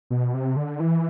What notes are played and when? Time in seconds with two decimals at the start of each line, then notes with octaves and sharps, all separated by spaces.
0.10 B2
0.34 C3
0.56 D3
0.80 E3